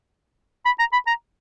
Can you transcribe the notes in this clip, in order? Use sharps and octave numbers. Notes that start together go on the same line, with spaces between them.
B5
A#5
B5
A#5